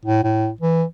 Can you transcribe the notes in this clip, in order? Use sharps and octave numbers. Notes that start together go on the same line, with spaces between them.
A2
A2
E3